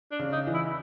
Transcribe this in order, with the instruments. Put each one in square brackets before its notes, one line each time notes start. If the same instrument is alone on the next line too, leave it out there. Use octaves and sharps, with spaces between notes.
[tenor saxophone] D4
[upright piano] C#3
[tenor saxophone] D#4
[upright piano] E3
[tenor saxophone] E4